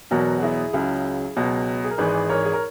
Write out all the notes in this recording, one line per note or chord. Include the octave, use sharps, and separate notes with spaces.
E2 B2 F#3 F#4 A#4
F#4
E4 G#4
C#2 C#3 F#3
C#2 B2 F#3
G#4
A#4
G#1 G#2 E3 G#4 B4
A#4 C#5
G#4
A#4